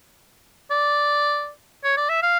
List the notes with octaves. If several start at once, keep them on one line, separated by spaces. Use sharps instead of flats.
D5
C#5
D5
E5
F5